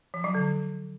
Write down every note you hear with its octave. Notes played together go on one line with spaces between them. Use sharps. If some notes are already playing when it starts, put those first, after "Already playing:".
F3
F#3
D3